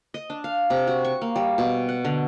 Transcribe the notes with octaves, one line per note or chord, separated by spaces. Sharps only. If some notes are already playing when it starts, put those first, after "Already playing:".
D#5
D4
F5
C3
F#4
C#6
A#3
G3
B2
F#5
D3